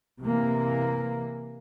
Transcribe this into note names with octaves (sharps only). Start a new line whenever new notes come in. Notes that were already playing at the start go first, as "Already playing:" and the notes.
C3 E3 A#3